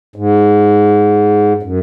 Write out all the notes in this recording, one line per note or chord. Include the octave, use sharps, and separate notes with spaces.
G#2
F#2